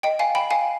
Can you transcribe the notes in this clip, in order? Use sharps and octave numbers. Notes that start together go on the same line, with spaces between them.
D#5 G5
F5 G#5
G5 B5
F5 G#5